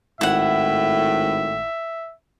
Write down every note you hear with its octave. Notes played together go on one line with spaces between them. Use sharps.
G#1 A2 E4 E5 F#5